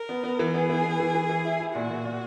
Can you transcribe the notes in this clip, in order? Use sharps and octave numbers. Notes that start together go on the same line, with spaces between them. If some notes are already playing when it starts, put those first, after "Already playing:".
Already playing: A#4
B3
B3
E3
B3 G#4
E3
B3
E3
E3
E3
E4
E4
A#2 F#4
A#2
A#2